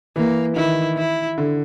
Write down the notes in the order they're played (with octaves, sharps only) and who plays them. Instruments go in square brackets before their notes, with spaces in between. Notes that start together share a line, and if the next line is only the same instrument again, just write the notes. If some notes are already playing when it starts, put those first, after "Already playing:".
[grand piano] E3 [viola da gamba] A#3
[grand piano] D#3 [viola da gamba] E4
[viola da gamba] E4
[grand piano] D3